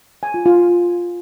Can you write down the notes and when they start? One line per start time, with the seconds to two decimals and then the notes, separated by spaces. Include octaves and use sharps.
0.23 G#5
0.34 F4
0.46 F4